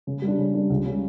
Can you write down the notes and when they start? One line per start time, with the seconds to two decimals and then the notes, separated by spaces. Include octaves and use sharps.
0.07 C#3
0.22 G3
0.27 D4
0.38 C#3
0.54 G3 D4
0.70 C#2
0.86 C#3 G3